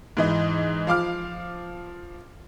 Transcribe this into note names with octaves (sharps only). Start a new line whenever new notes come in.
G#2 E3 D#5
F3 F5 D6 F6